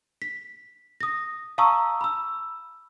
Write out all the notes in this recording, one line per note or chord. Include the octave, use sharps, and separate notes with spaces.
B6
D#6 A#6
F5 A5 A#5 C#6 D#6 E6
B5 E6